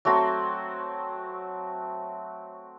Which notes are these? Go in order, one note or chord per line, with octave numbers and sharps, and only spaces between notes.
F#3 A3 C4 F#4